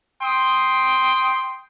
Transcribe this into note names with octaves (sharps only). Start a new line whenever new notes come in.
G5 C6 D#6